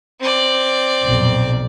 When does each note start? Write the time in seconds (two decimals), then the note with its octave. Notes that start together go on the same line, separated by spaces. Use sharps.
0.20 C4 D5
1.05 B1 F2 A#2